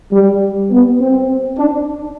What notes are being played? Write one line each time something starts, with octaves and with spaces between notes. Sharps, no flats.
G3
B3
C4
D4